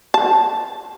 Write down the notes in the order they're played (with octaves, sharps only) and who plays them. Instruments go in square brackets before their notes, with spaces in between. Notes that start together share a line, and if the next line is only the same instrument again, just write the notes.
[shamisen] A5